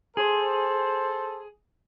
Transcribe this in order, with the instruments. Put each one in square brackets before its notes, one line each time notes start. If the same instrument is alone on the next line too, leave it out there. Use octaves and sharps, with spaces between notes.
[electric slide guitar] G#4 [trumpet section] A4 C5